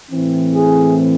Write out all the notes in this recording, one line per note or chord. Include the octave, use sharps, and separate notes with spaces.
A2 E3 C4
G#4